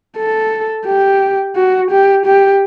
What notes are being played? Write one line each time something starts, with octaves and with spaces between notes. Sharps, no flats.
A4
G4
F#4
G4
G4